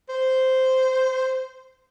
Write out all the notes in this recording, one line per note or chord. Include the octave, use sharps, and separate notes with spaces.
C5